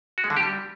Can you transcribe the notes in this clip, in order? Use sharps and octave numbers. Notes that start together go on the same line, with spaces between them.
F#4
G#3
D3
G4
G3